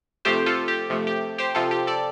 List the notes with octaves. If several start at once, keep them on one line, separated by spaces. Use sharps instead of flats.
C3 F3 A3 G4 C5
F4 A4
G4
C3 F3 A3
G4
G4 C5
C3 F3 C4 F4 A4
G4
A4 D5